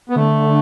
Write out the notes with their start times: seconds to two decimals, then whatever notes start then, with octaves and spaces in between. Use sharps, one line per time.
0.09 B3
0.15 D3 A3